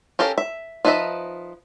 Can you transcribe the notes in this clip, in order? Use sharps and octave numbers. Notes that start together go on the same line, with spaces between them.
C#4 G4 A4 A#4 F5
E5
F3 D#4 B4 D#5 E5